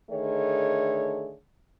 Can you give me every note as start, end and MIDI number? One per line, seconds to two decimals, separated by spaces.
0.11 1.34 50
0.11 1.34 51
0.11 1.34 57
0.11 1.34 68
0.11 1.34 73